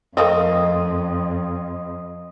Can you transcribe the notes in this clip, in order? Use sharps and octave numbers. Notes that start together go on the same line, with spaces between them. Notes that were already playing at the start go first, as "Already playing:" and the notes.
F2 A3 A#3 C4 D#5